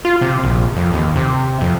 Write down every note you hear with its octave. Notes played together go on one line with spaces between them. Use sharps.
F4
C3
A#1
F2
D#2
C3
F2